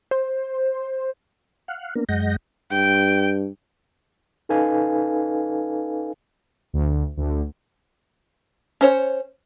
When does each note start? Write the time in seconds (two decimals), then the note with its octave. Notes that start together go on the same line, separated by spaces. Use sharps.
0.11 C5
1.68 F5 F#5
1.95 A#3 B3 D4 A#4
2.09 F#2 G#3 D#5 F#5 G6 A#6
2.72 G2 G5
4.49 C#4 D#4 A4 B4 F5 G#5
6.73 D2
7.17 D2 D3
8.81 C#4 C5 C#5